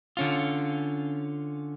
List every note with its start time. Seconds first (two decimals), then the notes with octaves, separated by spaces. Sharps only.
0.17 D3 C#4 F4